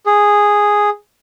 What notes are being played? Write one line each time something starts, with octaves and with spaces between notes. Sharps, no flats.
G#4